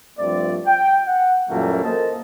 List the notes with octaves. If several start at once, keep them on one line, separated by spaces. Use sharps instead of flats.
G2 F3 A3 C4 D5
G5
F#5
F#2 A#2 E3 G3 A3 A#3
A#3 A4 A#4 C5 D#5 A5